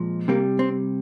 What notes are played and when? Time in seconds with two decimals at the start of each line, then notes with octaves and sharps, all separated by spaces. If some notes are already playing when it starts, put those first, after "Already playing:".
Already playing: A#2 F3 G#3
0.28 C3 G3 A#3
0.59 C4